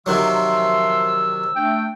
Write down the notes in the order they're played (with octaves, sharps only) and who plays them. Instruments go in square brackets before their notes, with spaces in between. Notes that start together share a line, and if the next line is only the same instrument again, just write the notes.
[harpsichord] C3 D#3 F#3 [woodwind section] F3 E5 C6 [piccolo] E6
[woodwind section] A3 D4 G5